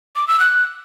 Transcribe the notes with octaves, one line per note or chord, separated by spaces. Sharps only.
D6
E6
F#6